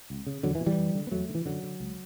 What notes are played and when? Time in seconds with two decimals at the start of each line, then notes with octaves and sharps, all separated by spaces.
0.10 C#2
0.27 C#3
0.43 E2 D3 F#3
0.55 E3
0.60 B2
0.66 E3 G3
0.78 F#2
0.95 D3
1.07 B3
1.11 E2 F#3 A3
1.29 D3
1.35 E3
1.46 F#2 D3 F#3
1.63 D3
1.80 C#2